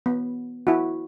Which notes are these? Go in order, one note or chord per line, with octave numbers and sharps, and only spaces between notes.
B3
E4 F#4